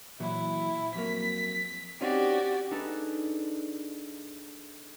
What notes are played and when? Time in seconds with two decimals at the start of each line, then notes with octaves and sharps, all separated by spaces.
0.20 A#2 E3 F#3 E4
0.95 F2 F#3 A#3 B6
2.01 C4 C#4 D#4 F#4 G4 D5
2.70 A3 D4 D#4 G#4 A4 B4